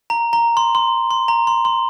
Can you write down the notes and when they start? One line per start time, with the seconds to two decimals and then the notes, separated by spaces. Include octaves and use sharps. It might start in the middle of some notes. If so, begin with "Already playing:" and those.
0.10 A#5
0.33 A#5
0.57 C6
0.75 C6
1.11 C6
1.28 A#5
1.47 C6
1.65 C6